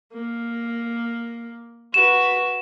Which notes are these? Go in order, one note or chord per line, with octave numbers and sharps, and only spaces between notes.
A#3
F#4 B4 E7